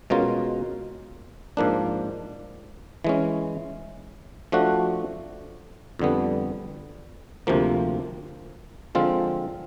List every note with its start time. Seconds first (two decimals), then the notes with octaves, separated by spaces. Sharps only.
0.10 B2 G#3 C#4 F4 A#4
1.57 G#2 F3 A#3 D4
3.04 E3 G#3 C#4
4.52 F3 A3 D4 F#4
5.99 F2 D3 G3 B3
7.47 D2 C3 F3 A#3
8.95 D3 F3 G#3 C4 F4